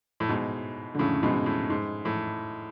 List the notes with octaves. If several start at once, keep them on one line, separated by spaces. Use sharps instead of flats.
A2
G#2 B2
D3
A2 C#3
G#2 B2
A2
G#2
A2